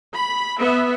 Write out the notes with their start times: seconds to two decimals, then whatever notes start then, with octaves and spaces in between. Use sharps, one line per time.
0.13 B5
0.59 B3 E5